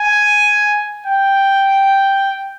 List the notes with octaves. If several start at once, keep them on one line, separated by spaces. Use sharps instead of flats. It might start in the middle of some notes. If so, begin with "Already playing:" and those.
Already playing: G#5
G5